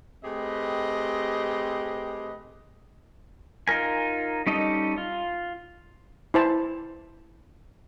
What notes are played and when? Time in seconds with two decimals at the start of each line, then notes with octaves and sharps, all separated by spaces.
0.23 A3 C4 G4 G#4 B4 D#5
3.68 D#4 F4 A#4 G#5
4.46 G3 C#4 D#4 A4 D#5
4.98 F4
6.34 E4 C5 A5